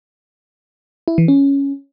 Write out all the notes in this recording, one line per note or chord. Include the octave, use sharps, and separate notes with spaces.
E4
E3
C#4